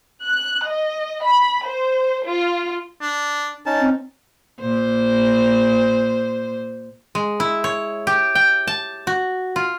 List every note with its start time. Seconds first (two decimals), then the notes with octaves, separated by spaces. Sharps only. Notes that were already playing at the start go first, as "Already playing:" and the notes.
0.24 F#6
0.67 D#5
1.22 B5
1.67 C5
2.28 F4
3.02 D4
3.66 C#4 D#4 A5
3.80 C4
4.61 A#2 C5
7.15 G#3
7.40 E4
7.64 C#5
8.07 G4
8.35 G5
8.67 A5
9.07 F#4
9.56 F4